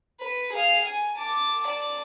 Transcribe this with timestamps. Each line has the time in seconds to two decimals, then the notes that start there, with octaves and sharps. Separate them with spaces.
0.20 B4
0.53 G#4 F5
0.85 G#5
1.18 A5 D6
1.67 D5 A5